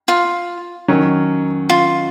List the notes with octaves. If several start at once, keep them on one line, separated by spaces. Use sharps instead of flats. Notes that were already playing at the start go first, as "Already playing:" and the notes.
F4
D#3 F#3 C#4
F4